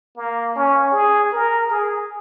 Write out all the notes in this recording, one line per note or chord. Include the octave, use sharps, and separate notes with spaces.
A#3
C#4
G#4
A#4
G#4